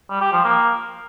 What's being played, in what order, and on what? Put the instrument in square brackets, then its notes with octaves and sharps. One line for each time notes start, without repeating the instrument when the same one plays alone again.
[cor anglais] G3
G4
F3
A#3